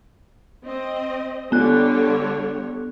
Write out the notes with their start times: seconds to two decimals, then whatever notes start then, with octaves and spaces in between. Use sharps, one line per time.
0.63 C4 D#5
1.52 D3 G3 B3 C#5 F#6